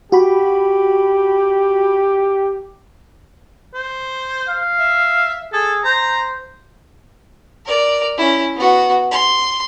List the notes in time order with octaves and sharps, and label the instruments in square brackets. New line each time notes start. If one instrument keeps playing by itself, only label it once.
[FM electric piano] F#4 B5 [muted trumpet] G4
[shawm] C5
[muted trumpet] F5
[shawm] E5
[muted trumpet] G#4 [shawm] A4
[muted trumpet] C5 [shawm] A#5
[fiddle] A#4 D5
C#4 E4
B3 F#4
C6